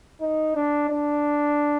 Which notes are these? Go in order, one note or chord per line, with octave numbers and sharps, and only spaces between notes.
D#4
D4
D4